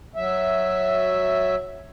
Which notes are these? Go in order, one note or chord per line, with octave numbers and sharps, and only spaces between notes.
F#3 E5